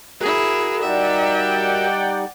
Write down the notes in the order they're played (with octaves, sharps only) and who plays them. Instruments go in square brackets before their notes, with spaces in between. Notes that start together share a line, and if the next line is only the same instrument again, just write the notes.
[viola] E4 G#4 [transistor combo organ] F#4 A#4
[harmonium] G3 D#4 [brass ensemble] D5 F#5 G5 [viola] E5